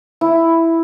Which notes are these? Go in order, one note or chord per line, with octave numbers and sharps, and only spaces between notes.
E4